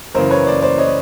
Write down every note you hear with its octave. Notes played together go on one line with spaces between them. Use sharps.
F#2 C#3 E3 A#4 C5
B4 C#5
C5 D5
C5 D5
C#5 D#5